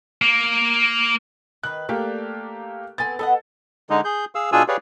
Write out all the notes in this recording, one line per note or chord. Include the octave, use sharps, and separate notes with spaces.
A#3
D#3 B4 F#6
A3 A#3 D4 G4
B3 C4 A4 G#5 A6
B3 A4 D#5 F#5
D3 G#3 D#4
G#4 G6
G#4 F5 E6
B2 D4 F4 G#4 G#5 E6
G4 G#4 B4 C#5 D5 F5